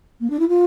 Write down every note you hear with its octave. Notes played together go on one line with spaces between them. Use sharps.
A#3
D4
E4
F4